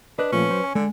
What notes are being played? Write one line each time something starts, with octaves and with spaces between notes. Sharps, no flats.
D4 B4 D#5 F#6
A#2 F3 A3 C#4
F#3 C5
G#5
D3 G#3